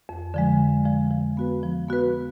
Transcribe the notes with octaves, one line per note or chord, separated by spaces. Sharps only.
F2
D3 F3 G#3
F2
D3 F3 G#3
F3
B3 F#4 B4
F3
B3 F#4 B4